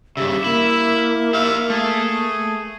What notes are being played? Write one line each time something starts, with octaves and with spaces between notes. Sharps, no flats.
G2 C#3 G4 E5
A#3 E4
G4 E5 F5
A3 G#4